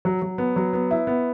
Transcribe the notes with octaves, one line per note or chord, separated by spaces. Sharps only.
F#3
F#3
B3
F#3
B3
E4
B3